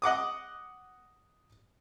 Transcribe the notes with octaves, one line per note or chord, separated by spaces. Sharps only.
D#5 F#5 D6 D#6